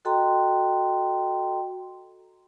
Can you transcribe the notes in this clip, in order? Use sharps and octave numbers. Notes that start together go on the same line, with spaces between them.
F#4 A4 D#5 G5 A#5 C6